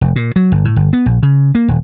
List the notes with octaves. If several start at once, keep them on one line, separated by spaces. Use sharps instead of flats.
F1
A#2
F#3
G1
A2
G1
B3
A#1
C#3
A#3
D#1